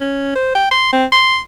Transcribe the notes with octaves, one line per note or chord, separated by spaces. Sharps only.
C#4
C5
G5
C6
C4
C6